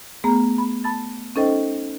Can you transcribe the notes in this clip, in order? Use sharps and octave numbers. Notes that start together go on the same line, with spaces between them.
A3 B3 G#4 A#5
B5
A5 B5 A6
C#4 D#4 A4 C5 D#5 G5